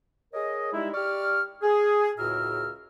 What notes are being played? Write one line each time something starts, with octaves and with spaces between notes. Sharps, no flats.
G#4 A#4 C#5 D#5
G3 G#3 D#4 E4
G4 D5 C#6 F6
G#4
C#2 A2 F#4 A#4 E5 F6